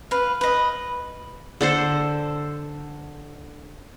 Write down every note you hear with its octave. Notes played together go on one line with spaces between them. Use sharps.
B4 F5
B4 D#5
D3 A4 C5